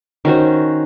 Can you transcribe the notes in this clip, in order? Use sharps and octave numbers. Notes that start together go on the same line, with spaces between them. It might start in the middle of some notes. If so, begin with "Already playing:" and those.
D#3 C#4 F#4 C5